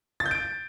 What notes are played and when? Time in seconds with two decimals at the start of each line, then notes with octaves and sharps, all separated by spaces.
0.20 A6
0.26 G6
0.31 D7